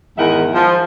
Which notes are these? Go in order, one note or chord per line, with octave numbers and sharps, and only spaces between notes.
E2 G#2 D#3 A#4 E5 F#5
F3